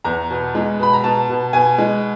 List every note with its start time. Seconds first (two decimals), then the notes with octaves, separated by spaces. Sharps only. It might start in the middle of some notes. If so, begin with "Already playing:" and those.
0.04 E2 A#5
0.30 B2
0.55 G#3
0.79 B2 B5
0.93 A#5
1.04 B2 A5
1.29 B2
1.53 B2 G#5
1.78 G#3